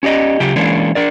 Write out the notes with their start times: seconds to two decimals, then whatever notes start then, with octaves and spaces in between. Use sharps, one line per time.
0.03 C#4 G4 D5 D#5
0.40 C#3 F#3 F4 G4
0.56 E3 G#3 A#3 C#4 D4
0.95 D4 A#4 D5